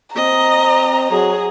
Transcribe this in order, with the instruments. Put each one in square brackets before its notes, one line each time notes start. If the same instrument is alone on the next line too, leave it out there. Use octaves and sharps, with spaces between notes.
[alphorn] C4 [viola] D#5 [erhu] A#5
[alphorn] F#3 [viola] G#4